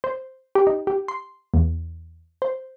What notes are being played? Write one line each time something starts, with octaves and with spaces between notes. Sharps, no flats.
C5
G4
D#4
G4
C6
E2
C5